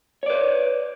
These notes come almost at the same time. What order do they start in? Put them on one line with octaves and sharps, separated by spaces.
C#5 D5 B4